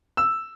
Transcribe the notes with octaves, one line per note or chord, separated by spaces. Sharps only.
E6